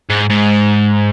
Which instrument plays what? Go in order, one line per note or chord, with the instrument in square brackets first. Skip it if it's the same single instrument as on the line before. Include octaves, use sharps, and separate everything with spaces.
[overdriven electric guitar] G#2
G#2